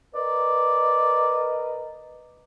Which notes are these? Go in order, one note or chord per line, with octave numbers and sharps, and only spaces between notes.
A#4 B4 D5 D#5